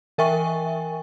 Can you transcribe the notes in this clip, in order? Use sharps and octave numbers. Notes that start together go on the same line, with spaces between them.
E3 A#4 E5 G5 G#5 C#6